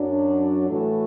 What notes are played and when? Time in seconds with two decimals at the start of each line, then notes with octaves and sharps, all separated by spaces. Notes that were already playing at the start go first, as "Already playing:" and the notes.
Already playing: F#2 F#3 D4
0.70 A2 E3 A3 F#4 A4